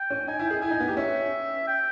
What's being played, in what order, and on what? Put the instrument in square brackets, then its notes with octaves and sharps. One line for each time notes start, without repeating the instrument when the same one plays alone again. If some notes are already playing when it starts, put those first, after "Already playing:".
Already playing: [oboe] G5
[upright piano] C#4
[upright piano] D#4 [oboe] G#5
[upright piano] E4
[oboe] G5
[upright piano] G#4
[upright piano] E4 [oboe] G#5
[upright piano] D#4
B3
G4
[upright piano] C#4 [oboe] E5
[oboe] G5